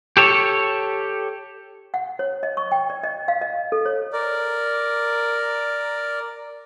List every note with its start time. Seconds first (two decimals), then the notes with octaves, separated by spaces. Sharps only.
0.17 G4 A4 C#5
1.94 F#5
2.19 C#5
2.43 D#5
2.57 C#6
2.72 G5
2.90 D5
3.03 D#5
3.28 F5
3.41 D#5
3.72 A4
3.85 C#5
4.12 A#4 D5